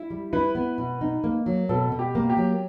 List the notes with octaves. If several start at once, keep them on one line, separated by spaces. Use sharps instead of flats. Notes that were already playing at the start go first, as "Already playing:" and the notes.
Already playing: E4
G3
E4 B4
B3
B2
D#4
A#3
F#3
B2 A4
B2
G4
A#3
G4
F#3